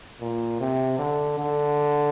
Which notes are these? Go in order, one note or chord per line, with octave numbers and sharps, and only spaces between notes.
A#2
C3
D3
D3